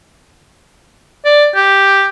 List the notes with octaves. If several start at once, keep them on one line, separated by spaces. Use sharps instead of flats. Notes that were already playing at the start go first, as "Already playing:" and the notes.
D5
G4